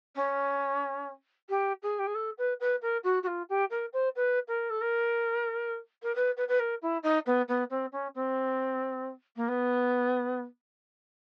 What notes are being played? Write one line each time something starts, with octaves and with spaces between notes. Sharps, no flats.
C#4
G4
G#4
G4
G#4
A4
B4
B4
A#4
F#4
F#4
F4
G4
A#4
C5
B4
A#4
A4
A#4
A#4
B4
B4
B4
A#4
E4
D#4
B3
B3
C4
C#4
C4
A#3
B3